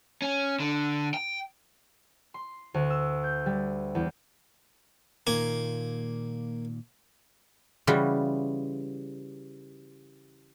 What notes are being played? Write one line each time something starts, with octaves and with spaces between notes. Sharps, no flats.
C#4
D3
G5
C6
D2
E6
G6
G3
E2
A#2 D#3 A#3 G#5
C#3 E3 G3 F4 F#4